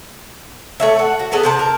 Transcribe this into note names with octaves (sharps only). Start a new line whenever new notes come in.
A3 C#5 E5
F#5
F#4
A3 B3 G#4 A4
C3 C4 A5
A#4